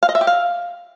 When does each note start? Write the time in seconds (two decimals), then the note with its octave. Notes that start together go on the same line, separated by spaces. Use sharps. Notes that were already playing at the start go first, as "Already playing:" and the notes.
0.03 F5
0.09 D#5
0.15 E5
0.21 G4
0.27 F5